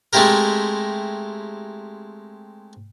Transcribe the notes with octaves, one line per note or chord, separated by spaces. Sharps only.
G#3 A3 C4 E4 G4 A#4